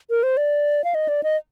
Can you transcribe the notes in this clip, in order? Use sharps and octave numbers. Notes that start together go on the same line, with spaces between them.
A#4
C5
D5
F5
D#5
D5
D#5